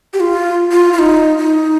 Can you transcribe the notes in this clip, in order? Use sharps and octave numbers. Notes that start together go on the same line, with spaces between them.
G4
F4
F4
F4
D#4
D#4